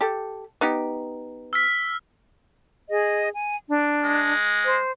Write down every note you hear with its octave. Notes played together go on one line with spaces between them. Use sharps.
G4 A4
B3 D#4 G4
E6 F6 B6
G#4 D#5
G#5
D4
G#3
C5